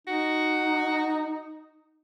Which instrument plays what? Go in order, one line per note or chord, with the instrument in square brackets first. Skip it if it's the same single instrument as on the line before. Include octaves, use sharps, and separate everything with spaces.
[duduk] D#4 [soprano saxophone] F#4